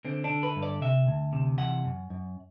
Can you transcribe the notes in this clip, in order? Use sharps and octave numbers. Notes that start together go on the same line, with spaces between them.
D3 C4
D4
D3
B4
G2
D5
C3 E5
D2
C3
E3 F#5
F#2
F#2